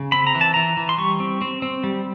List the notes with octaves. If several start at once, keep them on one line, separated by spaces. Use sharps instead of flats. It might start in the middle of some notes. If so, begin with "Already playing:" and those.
Already playing: C#3
C4 B5
A#5
E3
A5
E3 A#5
E3
C6
G3 C#6
C4
C4
C4
G3